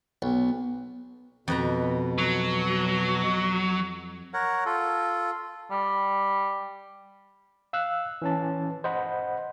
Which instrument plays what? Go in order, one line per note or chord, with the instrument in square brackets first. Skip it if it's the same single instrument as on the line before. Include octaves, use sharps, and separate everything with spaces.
[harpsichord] B1
[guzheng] F2 B4 A#5 [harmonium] B2
[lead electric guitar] F#3
[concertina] A#4 C#5 F#5
F4 A4
[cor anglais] G3
[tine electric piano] F5 E6 F#6
E3 C#4 A5
C5 D#5 F#5 B5